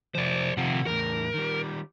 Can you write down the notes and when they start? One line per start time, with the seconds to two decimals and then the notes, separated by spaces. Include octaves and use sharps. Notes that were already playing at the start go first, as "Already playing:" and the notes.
0.15 C3 F3 C5 D5
0.57 C3 D#3 F3 F#5
0.86 E2 A2 A#4
1.34 D#3 G3